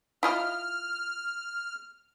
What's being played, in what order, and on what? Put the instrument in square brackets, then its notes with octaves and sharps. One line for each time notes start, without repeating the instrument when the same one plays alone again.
[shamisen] E4 F4 D#5 [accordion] F6